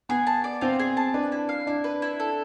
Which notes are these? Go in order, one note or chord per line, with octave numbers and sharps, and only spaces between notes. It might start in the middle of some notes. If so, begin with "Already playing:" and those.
B3 G#4
A5
D5
C4 F4
G#4
A5
D4 B4
E4
F5
D4 E4
B4
E4
A4